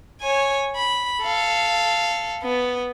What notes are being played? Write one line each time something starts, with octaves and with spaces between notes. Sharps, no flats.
C#5 G#5
B5
A4 F5
B3